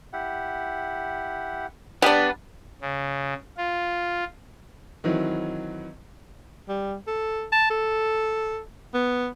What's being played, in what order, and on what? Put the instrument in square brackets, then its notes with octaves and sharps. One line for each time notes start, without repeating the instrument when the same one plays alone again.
[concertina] E4 G4 F#5
[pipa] G3 D4 [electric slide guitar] B4 F#5 [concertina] D5
[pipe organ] C#3
F4
[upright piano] D#3 E3 F#3 C4 E4
[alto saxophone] G3
A4
A5
A4
B3